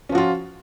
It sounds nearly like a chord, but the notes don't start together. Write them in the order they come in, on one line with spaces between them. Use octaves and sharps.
C#4 F3 F#4 F4